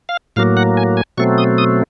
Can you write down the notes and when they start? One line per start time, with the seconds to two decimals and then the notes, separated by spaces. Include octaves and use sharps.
0.09 F5
0.36 A2 F#3 A#3 F5
0.57 F#5
0.77 G#5
0.97 G#5
1.18 B2 F#3 A3 C4 C#6
1.38 D#6
1.58 D#6